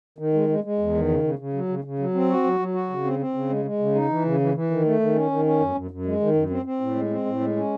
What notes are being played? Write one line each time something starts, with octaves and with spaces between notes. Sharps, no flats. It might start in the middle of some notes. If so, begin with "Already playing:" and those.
D#3
G#3
G#3
G#3
E2
D#3
C#3
C#3
C#3
F#3
C#3
C#3
F#3
C4
F#4
F#3
F#3
F#4
C#3
C4
C4
C#3
G#3
G#3
C#3
D#4
E3
C#3
E3
E3
D#3
A3
D#3
C#4
D#3
C#4
F#2
F#2
F#2
G#3
D#3
F#2
C4
C4
A2
G#3
C4
A2
G#3
C#4